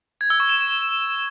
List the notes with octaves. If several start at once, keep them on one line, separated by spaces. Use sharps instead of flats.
G#6
E6
C#6
E7